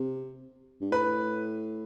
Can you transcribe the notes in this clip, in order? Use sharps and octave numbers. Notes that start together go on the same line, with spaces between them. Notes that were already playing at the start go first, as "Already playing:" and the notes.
Already playing: C3
G2
A2 B4